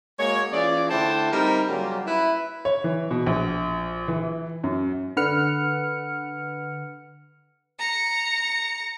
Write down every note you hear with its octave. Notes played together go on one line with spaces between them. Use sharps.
G#3 A#3 F#4 C#5
E3 C#4 F4 G#4 D5
D3 A3 E4 C5 G5 A5
G3 C4 D#4 G4 A#4
C#3 F#3 G3 A#3 F4 G4
E4 B4
C#5
E3
B2
A#1
E3
F#2
D3 B4 F#5 F6 C#7
A#5 C#7